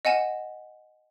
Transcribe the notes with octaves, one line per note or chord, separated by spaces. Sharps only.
D#5 F#5 G#5 E7